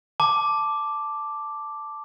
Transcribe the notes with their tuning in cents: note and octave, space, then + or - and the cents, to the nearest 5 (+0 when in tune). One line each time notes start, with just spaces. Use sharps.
A5 +0 D6 +0